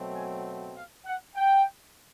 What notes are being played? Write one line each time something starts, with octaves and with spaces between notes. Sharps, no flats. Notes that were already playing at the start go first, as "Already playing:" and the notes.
Already playing: B2 F#3 A3 C4
G#5
G5
F5
F#5
G5